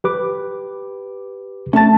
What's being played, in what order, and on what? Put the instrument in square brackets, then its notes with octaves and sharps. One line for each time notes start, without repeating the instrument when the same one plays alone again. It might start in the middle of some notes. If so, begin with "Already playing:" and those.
[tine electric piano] G4 B4 D6
[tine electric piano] A3 A6 [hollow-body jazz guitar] C#4 A5